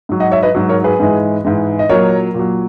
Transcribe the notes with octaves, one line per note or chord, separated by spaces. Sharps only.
G#2 F#3
D#5 F#5
C#5 E5
B4 D#5
G#2 F#3
A#4 C#5
G#4 B4
G#2 E3 G#3
G#2 E3 G#3
D#5
A#2 F#3 A#4 C#5
A#2 F#3